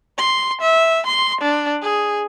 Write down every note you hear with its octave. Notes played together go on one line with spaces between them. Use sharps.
C6
E5
C6
D4
G#4